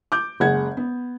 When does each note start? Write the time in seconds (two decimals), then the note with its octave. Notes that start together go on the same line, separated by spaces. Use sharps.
0.12 D6 G6
0.40 F#1 G#3 F#5 G#6
0.77 B3